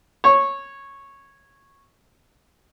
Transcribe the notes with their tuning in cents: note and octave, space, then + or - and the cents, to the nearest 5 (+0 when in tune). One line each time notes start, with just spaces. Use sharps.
C#5 -10